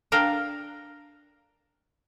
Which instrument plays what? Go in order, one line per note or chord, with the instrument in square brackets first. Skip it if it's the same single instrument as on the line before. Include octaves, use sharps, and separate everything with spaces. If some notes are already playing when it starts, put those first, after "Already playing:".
[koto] D4 A#4 D5 F5 G5